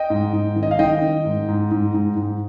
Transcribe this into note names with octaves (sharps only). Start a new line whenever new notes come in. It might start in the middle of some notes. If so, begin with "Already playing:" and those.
Already playing: D#5 G5
G#2
G#2
D#3
D#5
F5
D#3 D#5 G5
D#3
G#2
G#2
G#2
G#2
G#2